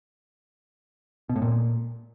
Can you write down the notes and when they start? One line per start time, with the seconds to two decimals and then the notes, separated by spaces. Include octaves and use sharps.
1.29 B2
1.36 A2
1.42 A#2